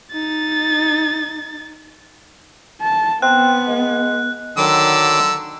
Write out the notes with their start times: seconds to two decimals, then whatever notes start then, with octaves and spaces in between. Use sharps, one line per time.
0.12 D#4 A6
2.81 A5
3.22 B3 C4 F#6
3.67 G#3
4.57 D3 D#3 F#3 D6 E6